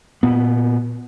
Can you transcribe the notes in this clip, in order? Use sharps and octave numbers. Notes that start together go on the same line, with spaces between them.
A#2 B3